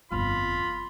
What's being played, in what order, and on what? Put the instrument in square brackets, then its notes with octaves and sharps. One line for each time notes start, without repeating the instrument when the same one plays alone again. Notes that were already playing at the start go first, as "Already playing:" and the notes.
[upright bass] G1 F2 [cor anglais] F4 [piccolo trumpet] B5